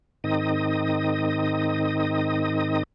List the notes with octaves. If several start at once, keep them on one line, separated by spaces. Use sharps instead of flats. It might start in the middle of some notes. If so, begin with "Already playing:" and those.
G#2 D#3 C4 D#4 D#5 D#6